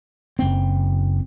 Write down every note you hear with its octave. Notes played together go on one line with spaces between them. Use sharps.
F#1 C4